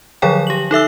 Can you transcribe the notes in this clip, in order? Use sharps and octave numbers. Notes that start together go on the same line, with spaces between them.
D3 F3 F#3 G#4 C#5 G5
G4 F#7
D#4 A4 E5 E6